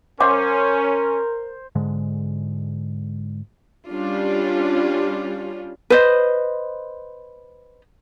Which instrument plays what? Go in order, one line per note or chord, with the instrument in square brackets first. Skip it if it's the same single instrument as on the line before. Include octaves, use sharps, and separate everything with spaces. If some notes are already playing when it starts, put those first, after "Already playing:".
[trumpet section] C#4 [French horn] A#4 [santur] C5 [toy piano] E5 F#5 D6
[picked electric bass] G#2 D3 G#3
[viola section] G3 C#4 D4 F4
[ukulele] B4 C5 D#5